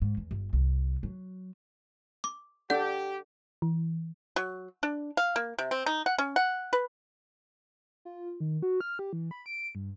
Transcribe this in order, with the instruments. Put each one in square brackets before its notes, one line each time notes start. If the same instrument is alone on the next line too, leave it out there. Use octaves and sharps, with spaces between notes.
[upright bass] G#2
E2
G1
C2
F#3
[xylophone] D6
[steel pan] D4 A4 D5 [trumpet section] G4 [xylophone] F#5 G6
[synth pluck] E3
[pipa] F#3
D4
F5
A#3
C3
C4
D#4
F#5
C#4
F#5
B4
[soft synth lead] F4
D#3
F#4
F6
G4
E3
B5
D7
G2